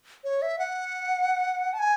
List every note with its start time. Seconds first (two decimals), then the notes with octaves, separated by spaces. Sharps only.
0.24 C#5
0.42 E5
0.59 F#5
1.73 A5
1.79 G#5